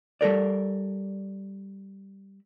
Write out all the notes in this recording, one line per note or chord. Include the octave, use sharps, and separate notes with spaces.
G3 A4 A#4 D5